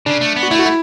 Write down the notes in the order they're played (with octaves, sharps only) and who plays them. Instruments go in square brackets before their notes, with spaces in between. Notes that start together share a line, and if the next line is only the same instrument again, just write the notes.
[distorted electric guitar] C#3 [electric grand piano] D4
[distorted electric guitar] A3
B3
[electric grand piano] F#4
[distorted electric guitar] A3 [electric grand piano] E4
[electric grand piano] F#4
E4